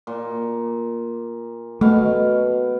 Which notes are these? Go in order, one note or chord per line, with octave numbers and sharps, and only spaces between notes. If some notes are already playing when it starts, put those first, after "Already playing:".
A#2
B2 A3 F5